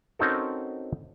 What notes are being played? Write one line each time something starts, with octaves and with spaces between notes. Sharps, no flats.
C4 C#4 D#4 F#4 A4 A#4